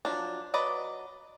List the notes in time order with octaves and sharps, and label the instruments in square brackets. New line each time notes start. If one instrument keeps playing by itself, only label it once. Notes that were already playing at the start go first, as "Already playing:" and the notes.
[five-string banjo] F3 F#3 D4
F#3 B4 D5 D#5